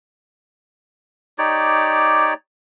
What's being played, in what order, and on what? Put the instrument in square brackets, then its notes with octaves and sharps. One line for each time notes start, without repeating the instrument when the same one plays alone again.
[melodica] D#4 G4 C#5 D5